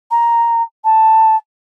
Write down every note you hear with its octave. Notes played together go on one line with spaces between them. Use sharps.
A#5
A5